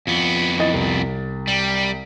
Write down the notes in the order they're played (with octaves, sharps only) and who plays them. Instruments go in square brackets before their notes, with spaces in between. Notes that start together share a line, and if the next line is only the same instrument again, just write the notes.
[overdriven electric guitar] F2 B3 [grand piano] F3
[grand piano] E3 D#5 A6
C2
[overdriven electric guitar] G3